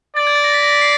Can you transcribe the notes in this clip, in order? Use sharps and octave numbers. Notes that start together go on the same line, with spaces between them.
D5 A6
G#6
A6
A#6
B6
A#6
B6
C7